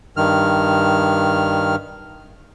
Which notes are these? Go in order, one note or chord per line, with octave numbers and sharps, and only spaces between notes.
G2 D#3 F6